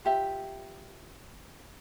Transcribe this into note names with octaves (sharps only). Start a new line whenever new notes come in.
F4 G4 E5